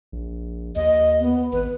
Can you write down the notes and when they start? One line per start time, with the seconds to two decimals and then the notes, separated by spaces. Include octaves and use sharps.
0.12 A#1
0.76 D#2 D#5
1.20 B3
1.53 G#1 B4